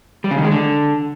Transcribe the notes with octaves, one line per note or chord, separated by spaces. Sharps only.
G3
C#3
D#3
G#3
D3